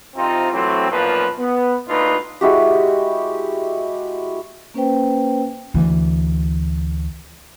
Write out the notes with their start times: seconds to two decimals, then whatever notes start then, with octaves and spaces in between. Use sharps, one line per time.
0.16 F2 C3 C4 D#4 F4
0.52 E3 F#3 A3 C4
0.91 B1 F#2 A#2 F3 F4 B4
1.39 B3
1.88 D2 A#2 D#4 F4 B4
2.41 G#3 E4 F#4 G4
4.74 A#3 C#4 B4 C5 G5
5.74 D2 E3